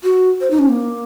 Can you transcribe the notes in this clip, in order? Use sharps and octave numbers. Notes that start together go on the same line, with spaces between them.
F#4
C5
D#4
C#4
A#3